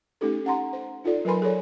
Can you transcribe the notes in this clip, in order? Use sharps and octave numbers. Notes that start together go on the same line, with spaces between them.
A3 C#4 D#4 G4 A4
C#4 F#5 A#5 C6
C5
D#4 F4 A4 D5
F#3 A#4 B4 G#5 B5 C6
G#4 A4 C#5 D5